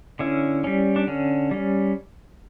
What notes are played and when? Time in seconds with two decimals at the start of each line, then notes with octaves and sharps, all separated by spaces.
0.19 D3 C#4 E4
0.64 G3 C#4
0.96 D4
1.08 D3 C#4
1.51 G3 C#4